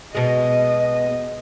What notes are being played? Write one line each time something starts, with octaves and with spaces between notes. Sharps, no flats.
B2 G#3 D#5